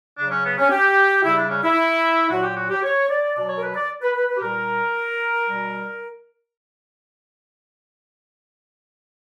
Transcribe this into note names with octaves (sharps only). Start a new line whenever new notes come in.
C#3 F#3 D4
C#4
B3
C#4
G4
C#3 G3 E4
D4
C#4
E4
A#2 F#3 F#4
G4
F#4
G4
C#5
D5
B2 F#3 D5
C#5
A#4
B4
D5
B4
B4
B4
G4
A#2 G3 A#4
B2 G3